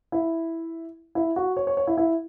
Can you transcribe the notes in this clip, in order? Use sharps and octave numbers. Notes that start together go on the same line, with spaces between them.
E4
E4
F#4
C#5
C#5
C#5
E4
E4